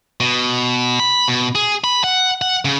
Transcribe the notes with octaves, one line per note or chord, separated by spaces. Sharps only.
B2
B5
B2
G#4
B5
F#5
F#5
C#3